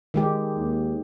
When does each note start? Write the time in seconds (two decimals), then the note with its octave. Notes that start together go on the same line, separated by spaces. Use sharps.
0.14 D#3 G#3 G4
0.57 D#2